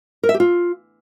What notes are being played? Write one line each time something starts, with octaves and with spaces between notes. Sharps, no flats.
A#4
E5
G4
F4